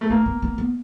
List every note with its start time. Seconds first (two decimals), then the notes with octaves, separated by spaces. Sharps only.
0.01 A3
0.10 A#3 B3
0.26 B3
0.42 B3
0.58 B3